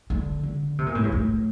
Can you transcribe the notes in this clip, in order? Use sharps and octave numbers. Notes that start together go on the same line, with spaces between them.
D3
D3
C3
A#2
A2
G2
A2